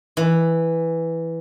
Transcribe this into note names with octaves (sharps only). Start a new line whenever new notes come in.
E3